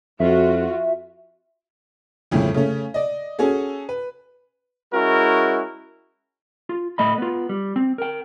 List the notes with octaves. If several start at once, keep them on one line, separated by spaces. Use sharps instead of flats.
F2 F4 F#4 E5
G1 F2 A2 C#3
C#3 A3 C#4
D5 D#5
C#4 F#4 G#4 A4
B4
G#3 C#4 E4 F#4 A#4
F4
A2 A3 D#5 B5
B3 F4
G3
C4
A#4 G5